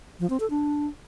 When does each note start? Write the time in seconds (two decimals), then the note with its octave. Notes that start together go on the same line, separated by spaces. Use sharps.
0.20 F3
0.30 C4
0.40 A4
0.50 D4